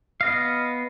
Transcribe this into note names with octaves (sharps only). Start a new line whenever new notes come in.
B3 D#5 F5